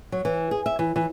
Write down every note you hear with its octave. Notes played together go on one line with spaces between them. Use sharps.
F#3
E3
G#4
E5
E3
E3